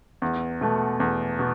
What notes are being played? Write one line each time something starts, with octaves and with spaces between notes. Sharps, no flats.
E2
B2 A3
E2
B2